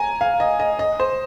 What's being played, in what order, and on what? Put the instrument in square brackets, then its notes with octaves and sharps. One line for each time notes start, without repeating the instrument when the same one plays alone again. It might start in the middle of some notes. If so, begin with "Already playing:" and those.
Already playing: [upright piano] G#5 A#5
F5
D#5
D#5
D#5
C5